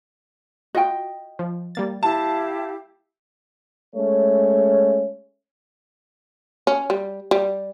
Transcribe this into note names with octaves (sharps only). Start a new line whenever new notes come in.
F4 F#4 D#5 G5
F3
G3 A#3 A6
E4 G4 F5 A5
G#3 A3 C#4 C#5
C#4
G3
G3